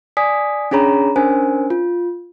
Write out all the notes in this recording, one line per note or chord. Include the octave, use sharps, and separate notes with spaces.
D5 G#5 D#6 B6
C#4 D4 G#4 C#5 A#5 B5
C#4 D4 A#4 C5 G#5
F4